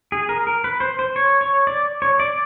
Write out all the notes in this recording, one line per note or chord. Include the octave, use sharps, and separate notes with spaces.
G#4
A#4
A#4
B4
C5
C5
C#5
C#5
D5
C#5
D5